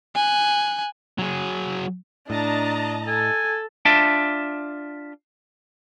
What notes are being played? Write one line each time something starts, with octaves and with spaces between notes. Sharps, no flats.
G#5 F#6
F#3 G#4
A2 D4 D#5 A5 A#5
A4 G#5
D4 F4 E5 A5